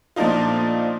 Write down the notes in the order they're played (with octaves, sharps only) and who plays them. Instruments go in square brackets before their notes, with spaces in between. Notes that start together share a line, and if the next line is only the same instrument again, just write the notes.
[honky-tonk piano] A#2 F3 A3 D4 D#4 F4